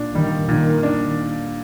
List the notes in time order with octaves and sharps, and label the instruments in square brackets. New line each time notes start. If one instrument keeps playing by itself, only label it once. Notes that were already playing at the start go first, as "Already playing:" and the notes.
Already playing: [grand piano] A#2 D4
[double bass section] D#3 [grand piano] G3
[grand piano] A#2 [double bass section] D#3
[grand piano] D4